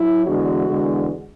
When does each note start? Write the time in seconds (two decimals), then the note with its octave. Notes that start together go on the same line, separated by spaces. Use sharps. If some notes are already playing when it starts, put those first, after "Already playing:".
Already playing: F#3 E4
0.25 E2 D3 G#3 F#4
0.67 E2 D3 G#3